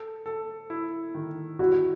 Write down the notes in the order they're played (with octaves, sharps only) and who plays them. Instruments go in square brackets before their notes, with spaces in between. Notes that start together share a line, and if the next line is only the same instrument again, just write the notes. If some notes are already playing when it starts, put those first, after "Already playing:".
Already playing: [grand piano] A4
A4
E4
D#3
[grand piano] E4 [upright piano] F#4